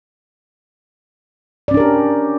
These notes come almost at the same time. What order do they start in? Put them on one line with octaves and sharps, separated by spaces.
D5 C#4 D4 A#4 G4